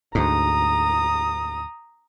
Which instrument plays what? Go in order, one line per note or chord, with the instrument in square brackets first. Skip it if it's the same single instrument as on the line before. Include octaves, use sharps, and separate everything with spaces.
[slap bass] D2 G#2 [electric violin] A#5 D#6